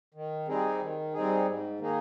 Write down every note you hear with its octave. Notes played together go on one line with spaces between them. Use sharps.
D#3
G3 C4 D#4 G#4
D#3
G3 C4 D#4 G#4
G#2
D#3 A#3 D#4 G#4